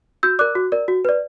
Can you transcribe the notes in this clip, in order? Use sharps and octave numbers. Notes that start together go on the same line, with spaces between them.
F#4 E6 G6
A#4 D5 D6 F#6
F#4
A#4 D5
F#4
B4 D5